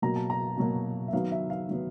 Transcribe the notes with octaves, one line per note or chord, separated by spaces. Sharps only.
B2 F#3 A#3 A#5
A5
A#5
B2 F#3 A#3
E5
D#3 F#3 B3 F5
E5
F5
D#3 F#3 B3